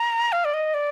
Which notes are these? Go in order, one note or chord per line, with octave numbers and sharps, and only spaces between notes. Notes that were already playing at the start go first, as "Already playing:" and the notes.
Already playing: A#5
F5
D5
D#5
D5